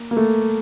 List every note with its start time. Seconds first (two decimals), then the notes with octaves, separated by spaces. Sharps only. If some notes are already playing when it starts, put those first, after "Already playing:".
Already playing: A#3
0.11 A#3
0.17 A3